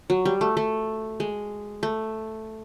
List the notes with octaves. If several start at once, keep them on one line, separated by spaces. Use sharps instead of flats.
F#3
G3
A3
A3
G#3
A3